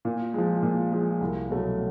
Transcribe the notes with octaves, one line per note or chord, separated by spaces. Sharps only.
A#2
F3 G#3
A#2
F3 G#3
C2
B2 F#3 A3